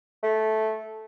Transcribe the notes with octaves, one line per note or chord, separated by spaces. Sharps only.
A3